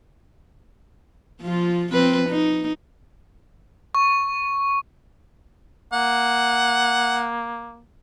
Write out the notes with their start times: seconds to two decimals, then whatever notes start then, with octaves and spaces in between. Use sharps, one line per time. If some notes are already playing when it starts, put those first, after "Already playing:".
1.42 F3 F4
1.93 F3 C4 B4
2.29 D#4
3.95 C#6
5.93 A#3 F#5